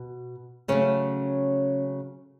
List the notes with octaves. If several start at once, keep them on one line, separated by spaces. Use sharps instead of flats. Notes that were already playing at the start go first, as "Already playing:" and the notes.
Already playing: B2
C#3 F#3 A3 C#4